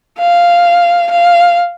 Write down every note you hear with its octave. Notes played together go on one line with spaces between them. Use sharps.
F5
F5